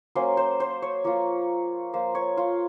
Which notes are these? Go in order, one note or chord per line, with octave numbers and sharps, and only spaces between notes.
F#3 A#3 C#4 C5
C5
C5
C#5
F3 A#3 F4
F3 A#3 F4 C5
C#5
F4